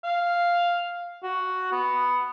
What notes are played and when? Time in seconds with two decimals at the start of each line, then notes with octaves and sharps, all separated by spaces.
0.04 F5
1.23 F#4
1.72 B3